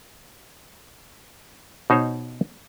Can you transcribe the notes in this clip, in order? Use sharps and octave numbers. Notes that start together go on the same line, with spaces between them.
B2 D#4 C5 C#5